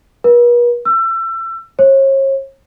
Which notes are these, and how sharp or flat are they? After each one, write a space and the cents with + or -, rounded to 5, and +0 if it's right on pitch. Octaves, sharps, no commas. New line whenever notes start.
B4 -45
E6 +30
C#5 -40